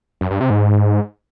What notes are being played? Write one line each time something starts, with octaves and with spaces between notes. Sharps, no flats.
F#2
G2
C3
G#2